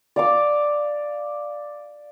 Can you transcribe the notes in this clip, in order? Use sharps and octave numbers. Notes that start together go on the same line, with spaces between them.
D5 F5 D6